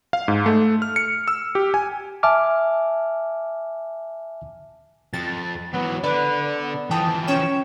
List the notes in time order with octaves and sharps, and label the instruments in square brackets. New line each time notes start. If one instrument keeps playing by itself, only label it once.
[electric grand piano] F5
G#2
A3
F6
C#7
E6
G4
G#5
[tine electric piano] E5 G#5 A5 D6 F6
[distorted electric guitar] F2 [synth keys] A6
[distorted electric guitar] E3 F#3 [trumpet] B3
[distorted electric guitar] D3 [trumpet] B4 [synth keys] D5
[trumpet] B3
[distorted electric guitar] E3 F3 [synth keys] G5 D#6 [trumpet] A5
[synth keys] C#4 G5 E7 [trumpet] C#5